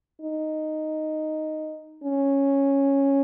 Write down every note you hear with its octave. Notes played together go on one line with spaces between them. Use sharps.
D#4
C#4